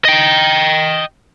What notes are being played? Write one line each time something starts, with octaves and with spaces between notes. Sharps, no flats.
D#5 G5